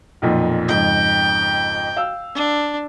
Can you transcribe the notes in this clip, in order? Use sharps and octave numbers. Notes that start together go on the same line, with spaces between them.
B1 F2 A#2
F2 G#2 C#3 G5
F5 E6
D4